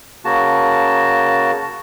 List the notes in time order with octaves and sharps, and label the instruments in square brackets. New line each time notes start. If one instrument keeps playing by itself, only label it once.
[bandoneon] C#3 A#3 F#4 A5